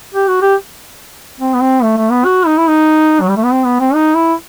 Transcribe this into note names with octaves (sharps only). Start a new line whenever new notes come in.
G4
F#4
G4
C4
B3
C4
A3
A3
B3
F#4
D#4
E4
D#4
F#3
G3
A3
B3
C4
B3
C4
D#4
E4